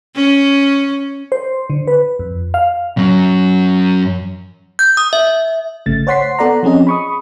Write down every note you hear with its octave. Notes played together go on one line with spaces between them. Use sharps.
C#4
C5
D3
B4
F2
F5
F#2 F#3
G6
D#6
E5
E5
G#1 C#3 A3 A6
C5 C#5 F#5 C6 B6 C7
B3 A4 D5 F#5 A#5
F3 C4 C#4 G#4 D#5
B5 C#6 D#6